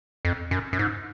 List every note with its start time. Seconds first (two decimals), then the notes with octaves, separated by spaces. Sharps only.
0.25 F2
0.51 F#2
0.73 F#2
0.79 G#2